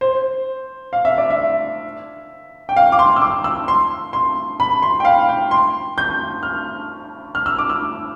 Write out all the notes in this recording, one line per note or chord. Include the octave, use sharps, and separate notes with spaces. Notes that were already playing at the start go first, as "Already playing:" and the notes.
C5
F5
E5
D5
E5
G5
F5
D6
C6
E6
D6
E6
C6
C6
B5
C6
G5
F5
G5
C6
G6
F6
F6
E6
D6
E6